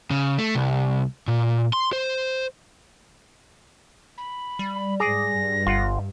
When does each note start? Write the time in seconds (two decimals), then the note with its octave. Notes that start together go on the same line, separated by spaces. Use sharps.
0.11 C#3
0.39 A3
0.55 C2
1.28 A#2
1.73 C6
1.93 C5
4.18 B5
4.59 G3
5.00 G#2 G#4 D5 A#6
5.33 G2
5.67 G1 F4 F#5